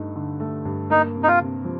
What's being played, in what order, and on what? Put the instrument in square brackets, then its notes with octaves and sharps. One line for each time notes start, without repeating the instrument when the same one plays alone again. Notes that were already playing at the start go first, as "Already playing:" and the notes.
Already playing: [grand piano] G2 A3 D#4
D3
A3
G2
[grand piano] A#3 [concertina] D#4
[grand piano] C3
[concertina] D#4
F4
[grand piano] C3
F3